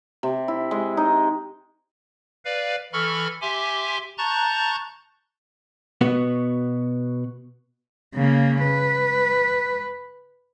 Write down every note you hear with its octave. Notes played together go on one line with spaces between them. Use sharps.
C3
E4
G#3
D#4
B4 D5 F5
E3 A4 B5 C#6 F6
G4 E5 G#5 C6 D6
A5 A#5 C#6 F#6 G6 A6
B2 B3 F#4
C#3 A#3
B4